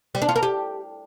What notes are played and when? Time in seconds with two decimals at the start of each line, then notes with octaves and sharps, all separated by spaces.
0.15 G3
0.22 D4
0.29 F4
0.36 A#4
0.43 G4